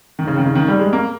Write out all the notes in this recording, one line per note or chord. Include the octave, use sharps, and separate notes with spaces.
D#3
C#3
D#3
C#3
D#3
G3
G#3
A#3